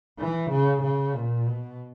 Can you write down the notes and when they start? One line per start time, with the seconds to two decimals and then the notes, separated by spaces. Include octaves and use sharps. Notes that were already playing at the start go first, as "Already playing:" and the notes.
0.20 E3
0.51 C#3
0.83 C#3
1.15 A#2
1.47 B2